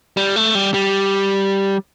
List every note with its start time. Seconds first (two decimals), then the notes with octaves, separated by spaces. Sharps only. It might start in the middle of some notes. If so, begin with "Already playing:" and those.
0.17 G3
0.36 A3
0.55 G3
0.74 G3